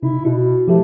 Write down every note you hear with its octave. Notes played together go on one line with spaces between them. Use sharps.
C3 D#4 E4
B2 E4
F3 A3 G4 A4